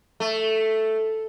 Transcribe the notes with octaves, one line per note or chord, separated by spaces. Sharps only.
A3